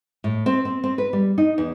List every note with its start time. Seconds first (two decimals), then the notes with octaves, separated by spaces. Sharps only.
0.24 A2
0.46 C4
0.65 C4
0.84 C4
0.98 B4
1.13 G3
1.38 D#4
1.58 E2